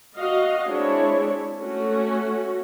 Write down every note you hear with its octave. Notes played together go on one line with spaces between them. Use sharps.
F#4 D#5 F5
G#3 C4 D4 E4 C#5
A3 C#4 F#4